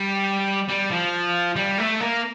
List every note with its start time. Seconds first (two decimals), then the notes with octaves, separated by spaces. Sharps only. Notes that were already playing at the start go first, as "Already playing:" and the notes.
Already playing: G3
0.68 G3
0.91 F3
1.57 G3
1.79 A3
2.01 A#3